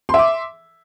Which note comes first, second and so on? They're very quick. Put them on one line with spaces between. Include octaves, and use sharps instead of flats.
C6 E5 D6